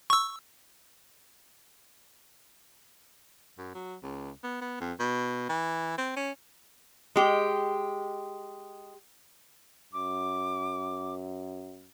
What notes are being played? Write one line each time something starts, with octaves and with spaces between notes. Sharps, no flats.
C#6 E6
F#2
F#3
C#2
B3
B3
F2
B2
E3
C4
C#4
G#3 G4
F#2 D6